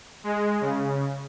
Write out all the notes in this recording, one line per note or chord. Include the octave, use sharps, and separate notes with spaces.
G#3
C#3